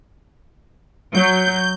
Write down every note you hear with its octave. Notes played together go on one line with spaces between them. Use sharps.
F#3 G6